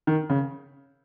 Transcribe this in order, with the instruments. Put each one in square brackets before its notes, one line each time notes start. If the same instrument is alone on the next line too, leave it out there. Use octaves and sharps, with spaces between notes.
[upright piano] D#3
C#3